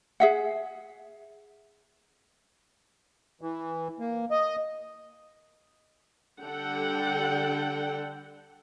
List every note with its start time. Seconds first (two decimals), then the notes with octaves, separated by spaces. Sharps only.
0.20 G#4 E5 F#5
3.41 E3
4.00 A#3
4.31 D#5
6.42 D3 G3 A4 F#5 G5